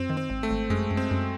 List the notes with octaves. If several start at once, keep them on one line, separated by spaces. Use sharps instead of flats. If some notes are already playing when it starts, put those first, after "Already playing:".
Already playing: F#2 C4
D#3
C4
G#1
A3
G#1
F#2 G#3
F#2
C4
F#2